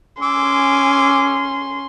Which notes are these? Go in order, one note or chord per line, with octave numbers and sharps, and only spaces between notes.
C#4 G#5 C6 D6 E6